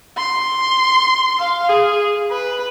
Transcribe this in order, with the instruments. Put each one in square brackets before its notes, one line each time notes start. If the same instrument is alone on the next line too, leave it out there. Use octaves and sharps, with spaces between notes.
[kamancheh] C6
F5
G#4
B4